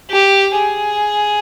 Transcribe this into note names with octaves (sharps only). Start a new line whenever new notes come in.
G4
G#4